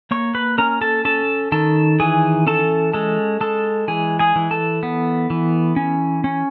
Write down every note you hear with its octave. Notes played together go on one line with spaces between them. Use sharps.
A#3 C#5 C#6
B4 B5
C#4 A#4 A#5
A4 A5
C#4 A4 A5
D#3 A4 A5
E3 G#4 G#5
C#4 A4 A5
G#3 A4 A5
G#3 A4 A5
E3 G#4 G#5
G#4 G#5
E3
A4 A5
B3
E3
C#4
C#4